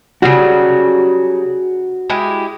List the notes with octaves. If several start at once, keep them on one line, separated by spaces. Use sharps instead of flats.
C#3 F#3 G3 F#4
G#3 E4 G4